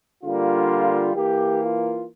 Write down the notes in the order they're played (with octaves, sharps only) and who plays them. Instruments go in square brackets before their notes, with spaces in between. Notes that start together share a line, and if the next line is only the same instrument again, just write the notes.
[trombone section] D3 G3 A#3 F4
E3 A#3 G4
F4